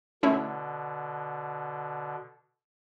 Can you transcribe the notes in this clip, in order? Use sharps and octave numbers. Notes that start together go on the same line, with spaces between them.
B2 D3 A3 C#4 E4